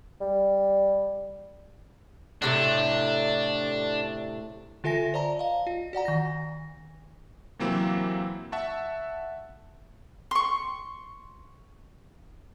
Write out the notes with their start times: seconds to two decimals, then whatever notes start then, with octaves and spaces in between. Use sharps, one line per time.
0.21 G3
2.42 A2 C3 A3 D4
4.84 D3 F4 A4 E5 G#5 A#6
5.14 C5 D5 A5 A#5
5.39 D#5 F5
5.67 F4
5.93 F#4 D5 F#5 A#5
6.05 D#3 A#6
7.59 C3 E3 F#3 A#3 C4 E4
8.52 E5 F#5 A5 C#6
10.31 C6 C#6